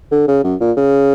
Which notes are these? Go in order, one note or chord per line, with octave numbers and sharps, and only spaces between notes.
D3
C#3
F#2
A#2
C#3